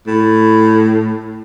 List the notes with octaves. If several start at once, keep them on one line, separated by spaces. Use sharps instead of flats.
A2